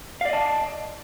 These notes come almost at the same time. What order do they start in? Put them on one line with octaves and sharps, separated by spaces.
F5 D5 D#5 A5